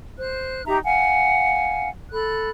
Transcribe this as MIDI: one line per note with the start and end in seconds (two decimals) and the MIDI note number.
0.18 0.62 72
0.18 0.62 90
0.65 0.78 63
0.65 0.78 67
0.65 0.78 76
0.65 0.78 82
0.83 1.88 77
0.83 1.88 78
0.83 1.88 80
2.11 2.49 69
2.11 2.49 83
2.11 2.49 90